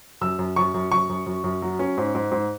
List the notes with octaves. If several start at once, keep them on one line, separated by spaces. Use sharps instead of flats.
F#2 E6
F#2
F#2 C#6
F#2
F#2 C#6
F#2
F#2
F#2
F#3
C#4
G#2
G#2
G#2